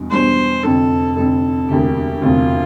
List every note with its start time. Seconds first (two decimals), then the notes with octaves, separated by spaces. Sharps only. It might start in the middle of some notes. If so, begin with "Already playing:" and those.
Already playing: E2 B2 G3 D4
0.10 E2 B2 G3 D4 C5
0.63 F1 F2 D3 A4
1.16 F1 F2 D3 A4
1.69 E1 D2 C3 G4
2.22 E1 D2 C3 F4